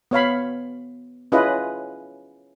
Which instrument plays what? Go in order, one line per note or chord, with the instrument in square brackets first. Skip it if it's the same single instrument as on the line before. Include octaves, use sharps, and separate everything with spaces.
[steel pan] B3 C#5 F5 B5
C#4 E4 F4 G#4 B4 D#5